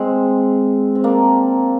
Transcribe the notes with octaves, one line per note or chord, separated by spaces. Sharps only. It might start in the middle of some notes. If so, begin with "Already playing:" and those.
Already playing: G#3 C4
C4
A#3 D4